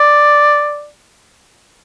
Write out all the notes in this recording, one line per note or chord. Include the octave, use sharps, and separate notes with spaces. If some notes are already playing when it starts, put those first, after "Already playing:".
Already playing: D5